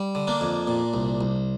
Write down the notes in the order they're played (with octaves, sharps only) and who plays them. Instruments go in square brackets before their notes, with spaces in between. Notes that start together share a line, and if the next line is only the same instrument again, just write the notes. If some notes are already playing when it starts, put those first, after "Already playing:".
Already playing: [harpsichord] G3
D3
A#3 D4
F2
A#2
C2
C2